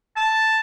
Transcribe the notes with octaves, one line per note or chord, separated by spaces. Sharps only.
A5